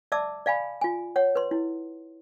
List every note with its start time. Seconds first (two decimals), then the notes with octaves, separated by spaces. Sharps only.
0.12 D5 E5 A5 D6 E6
0.46 D5 F5 G#5 B5
0.81 F4 G#5
1.16 C#5 F#5
1.35 B4 C6
1.51 E4